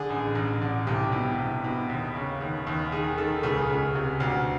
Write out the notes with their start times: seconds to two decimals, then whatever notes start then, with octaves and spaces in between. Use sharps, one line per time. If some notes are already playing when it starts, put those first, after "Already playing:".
Already playing: D3 G#4
0.10 A1
0.35 A1
0.62 D3
0.87 C2 G4
1.12 B2
1.38 C2
1.64 B2
1.89 D#2
2.15 C#3
2.41 D#2
2.67 D#2
2.92 D#3 G#4
3.17 D#3 A4
3.43 C#2 G#4
3.69 C#2
3.95 C3
4.20 D2